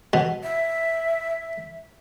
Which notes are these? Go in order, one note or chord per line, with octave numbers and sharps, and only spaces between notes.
B2
E5